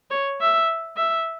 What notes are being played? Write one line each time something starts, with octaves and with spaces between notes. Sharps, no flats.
C#5
E5
E5